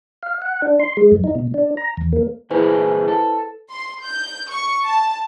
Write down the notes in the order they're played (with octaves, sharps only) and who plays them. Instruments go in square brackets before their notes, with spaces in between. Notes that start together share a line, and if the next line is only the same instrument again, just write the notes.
[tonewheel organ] F5
F#5
D4
C6
G#3
F#2
D#4
B2
D4
A#5
E2
A#3
[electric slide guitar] A#2 E3 G#4 [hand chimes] E4 B4 C5
[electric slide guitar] A4
[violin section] C6
G6
C#6
A5